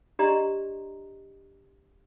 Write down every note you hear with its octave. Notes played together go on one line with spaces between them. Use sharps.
D4 G4 D5 D#5 A#5 C6